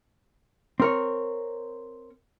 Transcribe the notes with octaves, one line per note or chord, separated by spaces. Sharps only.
C4 A#4 C#5